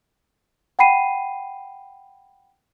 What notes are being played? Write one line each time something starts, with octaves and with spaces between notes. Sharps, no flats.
F#5 G5 B5 C7 D#7